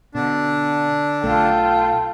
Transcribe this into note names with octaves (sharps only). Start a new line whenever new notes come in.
B2 D3 D4
B1 A3 F4 A4 G5